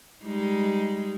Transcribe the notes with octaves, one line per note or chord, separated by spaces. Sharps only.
G3 G#3 D#4